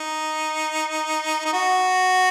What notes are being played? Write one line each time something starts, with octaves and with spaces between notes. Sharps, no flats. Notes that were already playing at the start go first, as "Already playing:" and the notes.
Already playing: D#4
D#4
F#4